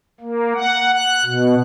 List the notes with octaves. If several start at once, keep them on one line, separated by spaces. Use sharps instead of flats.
A#3
F#5
F#6
B2